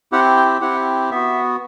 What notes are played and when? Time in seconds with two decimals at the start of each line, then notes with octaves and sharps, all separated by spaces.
0.12 C4 E4 G4 F#5
0.37 G5
0.61 C4 E4 G4 F#5
1.11 B3 F#4 E5